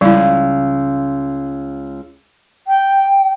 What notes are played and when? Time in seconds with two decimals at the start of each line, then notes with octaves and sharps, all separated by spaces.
0.01 C#2 G3 E4
2.67 G5